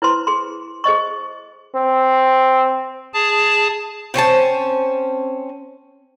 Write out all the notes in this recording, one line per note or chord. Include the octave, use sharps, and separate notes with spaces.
E4 B4 C5 C6
G#4 C6
G#4 C5 D#5 C#6
C4
G#4 A5
C4 C#4 C5 A5